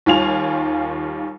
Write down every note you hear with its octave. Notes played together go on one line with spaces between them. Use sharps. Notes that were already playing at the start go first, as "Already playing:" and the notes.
D#2 D#3 G3 F4 G#5 F7